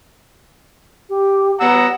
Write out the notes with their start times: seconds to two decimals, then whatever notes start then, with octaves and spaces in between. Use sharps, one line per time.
1.09 G4
1.61 B3 F#5 A#5 E6